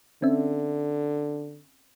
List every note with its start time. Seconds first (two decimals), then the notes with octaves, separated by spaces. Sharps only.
0.22 D3 C4 C#4 E5